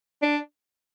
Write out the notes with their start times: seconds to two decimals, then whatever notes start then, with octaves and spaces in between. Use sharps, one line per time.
0.22 D4